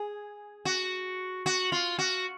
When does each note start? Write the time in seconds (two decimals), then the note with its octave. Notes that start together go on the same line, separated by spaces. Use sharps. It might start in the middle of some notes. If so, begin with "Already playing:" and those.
Already playing: G#4
0.65 F#4
1.46 F#4
1.72 F4
1.99 F#4